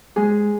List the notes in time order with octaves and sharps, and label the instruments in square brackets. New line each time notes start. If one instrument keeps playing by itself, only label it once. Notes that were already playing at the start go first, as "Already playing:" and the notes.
[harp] G#3 G#4